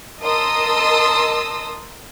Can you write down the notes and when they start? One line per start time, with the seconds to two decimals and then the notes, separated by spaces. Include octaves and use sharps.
0.22 A#4 D#5 A5 C6 D#6 E6